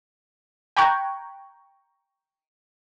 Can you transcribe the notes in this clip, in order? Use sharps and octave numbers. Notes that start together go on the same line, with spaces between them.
G5 A#5 B5 C#6 F#6 G#6